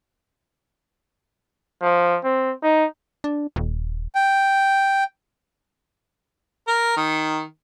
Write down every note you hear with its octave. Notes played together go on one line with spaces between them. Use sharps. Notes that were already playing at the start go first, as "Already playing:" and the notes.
F3
C4
D#4
D4
D#1
G5
A#4
D#3